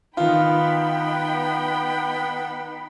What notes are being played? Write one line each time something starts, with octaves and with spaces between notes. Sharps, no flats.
D#3 B3 D#4 F4 G5 B5